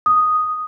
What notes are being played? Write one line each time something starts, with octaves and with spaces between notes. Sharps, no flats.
D#6